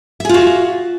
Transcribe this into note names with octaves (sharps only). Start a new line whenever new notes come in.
F4 F#4 G#4 E5